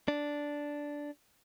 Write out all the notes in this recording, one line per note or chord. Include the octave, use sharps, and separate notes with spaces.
D4